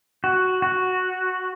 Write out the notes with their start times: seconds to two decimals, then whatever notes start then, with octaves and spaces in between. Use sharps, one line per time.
0.24 F#4
0.62 F#4